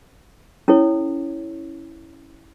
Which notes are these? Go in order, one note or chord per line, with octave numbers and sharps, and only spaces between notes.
C#4 E4 A4 C#5